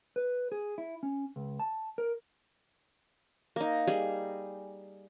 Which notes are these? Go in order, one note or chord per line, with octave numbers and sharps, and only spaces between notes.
B4
G#4
E4
C#4
C#2
A5
A#4
A#3 D#4
G3 G#4 G#5